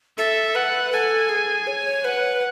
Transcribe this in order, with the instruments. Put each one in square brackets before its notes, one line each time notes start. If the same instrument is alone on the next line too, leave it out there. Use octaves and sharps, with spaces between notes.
[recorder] A4 [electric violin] E5
[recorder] B4 [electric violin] F#5
[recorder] A4 [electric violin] G#5
[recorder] G#4
C#5
[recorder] B4 [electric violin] F#5